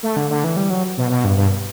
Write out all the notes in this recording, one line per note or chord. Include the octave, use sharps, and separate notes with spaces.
A3
D3
D3
E3
G3
F#3
B2
B2
G2
G2